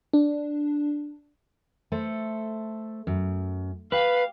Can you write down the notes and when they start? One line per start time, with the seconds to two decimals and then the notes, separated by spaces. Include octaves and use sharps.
0.13 D4
1.92 A3 A4 C5
3.07 F#2
3.92 G4 B4 F5